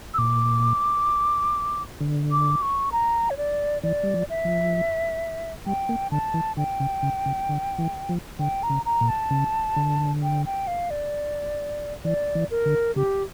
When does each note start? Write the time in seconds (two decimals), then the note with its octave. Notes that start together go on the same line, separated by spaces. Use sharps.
0.14 E6
0.18 A#2 D6
2.01 D3
2.31 D6
2.62 C#6
2.92 A#5
3.30 C#5
3.37 D5
3.83 E3 D5
4.03 G3
4.14 F3
4.30 E5
4.45 F3
5.66 G3 G5
5.89 A#3
6.12 D3 A5
6.34 E3
6.57 D3 G5
6.80 C#3
7.03 C#3
7.26 C#3
7.49 D3
7.78 E3
8.09 F3
8.39 D3 G5
8.63 A#5
8.70 C#3
8.85 A#5
9.01 A#2
9.09 A5
9.30 C#3
9.76 D3
10.23 G5
10.46 G5
10.67 F5
10.90 D5
12.05 E3 D5
12.35 E3
12.50 A#4
12.66 D3
12.96 C#3 G4